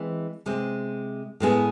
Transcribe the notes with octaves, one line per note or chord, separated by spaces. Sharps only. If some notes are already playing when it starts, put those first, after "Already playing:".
Already playing: E3 G#3 C4
C3 G#3 C4
A2 G#3 B3 E4 G#4